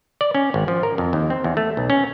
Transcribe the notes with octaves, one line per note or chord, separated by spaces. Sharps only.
D5
C#4
G#1
F3
A#4
F2
D#2
C4
E2
A3
B1
C#4